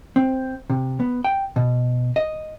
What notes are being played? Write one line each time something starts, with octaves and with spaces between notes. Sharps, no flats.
C4
C3
B3
G5
B2
D#5